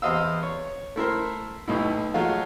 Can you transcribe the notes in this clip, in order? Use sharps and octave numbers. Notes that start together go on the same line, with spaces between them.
E2 C5 D#5 F5 E6
C#5
A3 E4 A#4 C5
B1 A2 D#4 E4
F#3 G#3 A3 F4